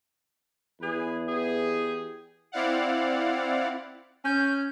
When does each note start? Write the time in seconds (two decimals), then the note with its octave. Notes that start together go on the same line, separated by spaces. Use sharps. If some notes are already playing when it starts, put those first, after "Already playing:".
0.81 E2 G#4 B4
1.28 B3 G4 G#4
2.52 C4 E4 D5 F5 F#5
4.25 C#4 G#5 G6